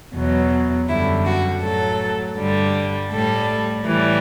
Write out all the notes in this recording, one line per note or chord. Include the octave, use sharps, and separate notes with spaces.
E2 B2 F#3
F#2 D3 G3 E4
F#4
A2 F#3 A4
G2 D3 G3
A2 G3 A4
A2 E3 G3